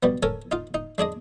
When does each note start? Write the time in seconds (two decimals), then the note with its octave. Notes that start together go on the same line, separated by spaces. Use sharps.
0.03 B2 G3 B3
0.23 C#4 A4 A#4 G#5
0.51 D#4 F4
0.74 D#4
0.98 G#3 D4 G#4 D#5